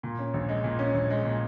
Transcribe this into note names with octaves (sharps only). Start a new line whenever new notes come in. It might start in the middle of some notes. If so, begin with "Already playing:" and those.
A#2
C#4
A#1
G#3
A#2
C#4
A#1
G#3
A#2